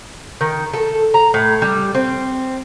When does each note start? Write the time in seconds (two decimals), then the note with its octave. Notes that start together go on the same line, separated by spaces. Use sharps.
0.41 D#3
0.74 A4
1.14 A#5
1.34 A2
1.62 G3
1.95 C4